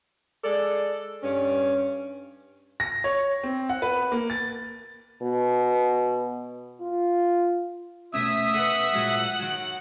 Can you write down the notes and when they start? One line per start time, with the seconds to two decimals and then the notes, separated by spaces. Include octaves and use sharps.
0.44 G#3 A4 D5
1.23 G2 C#4
2.80 A#6
3.04 C#5
3.44 C4
3.69 F#5
3.82 B4
4.12 A#3
4.30 A6
5.22 B2
6.81 F4
8.14 B2 A3 C#4 E5 D#6 E6
8.55 A4 B4 F#5
8.93 A#2 F#3 G#3
9.39 D#3 F#3